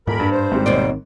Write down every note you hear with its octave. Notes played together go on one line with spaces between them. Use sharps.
D#1 G#2 A#4 B5
G2
C5
G#1 G#2 D#3 G3 C4
D#2 B2 D5